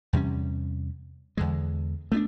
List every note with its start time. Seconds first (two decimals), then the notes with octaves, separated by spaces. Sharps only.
0.13 E2 C3 G3 C#4
1.37 E2 D3 G#3
2.12 A3 B3 C#4 D4